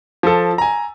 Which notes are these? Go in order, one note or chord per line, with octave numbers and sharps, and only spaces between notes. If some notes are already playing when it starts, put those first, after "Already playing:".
F3 A4
G#5 A#5